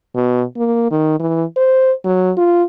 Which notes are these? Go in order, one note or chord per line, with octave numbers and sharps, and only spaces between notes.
B2
A#3
D#3
E3
C5
F#3
F4